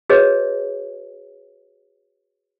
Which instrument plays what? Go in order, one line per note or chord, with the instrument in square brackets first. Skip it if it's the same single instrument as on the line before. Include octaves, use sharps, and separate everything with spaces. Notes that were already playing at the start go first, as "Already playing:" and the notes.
[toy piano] F#4 G#4 B4 C#5 D#5